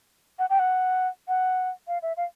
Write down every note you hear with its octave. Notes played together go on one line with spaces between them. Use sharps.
F#5
G5
F#5
F#5
F5
E5
F5